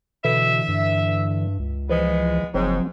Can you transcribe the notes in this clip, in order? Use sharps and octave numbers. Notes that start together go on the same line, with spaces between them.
B2 D3 E3 E5
G2
C#2
E3 F3 G#3 B3
F#1 G#2 F3 F#3 C4